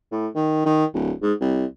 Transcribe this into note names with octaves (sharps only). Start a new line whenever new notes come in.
A2
D#3
D#3
D1
G#2
C2